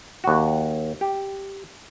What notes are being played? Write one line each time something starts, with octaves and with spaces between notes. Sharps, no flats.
D#2 F#4
G4